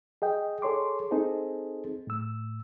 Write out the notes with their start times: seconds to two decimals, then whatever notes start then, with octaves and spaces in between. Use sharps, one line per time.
0.22 G#4 D#5 G5
0.62 G#4 A4 C#5 C6 D6
1.11 C4 D#4 G#4 A4 C5
2.07 A2 E6